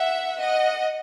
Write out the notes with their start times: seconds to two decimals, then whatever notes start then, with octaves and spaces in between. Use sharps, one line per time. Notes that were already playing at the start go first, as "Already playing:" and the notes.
Already playing: E5 F#5
0.40 D#5 F#5